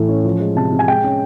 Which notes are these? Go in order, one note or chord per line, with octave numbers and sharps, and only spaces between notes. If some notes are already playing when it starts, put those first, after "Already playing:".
Already playing: A2 E3 A3
C#4
F3
G#3
C3 A5
C3
G#5
G#3 G5
C#4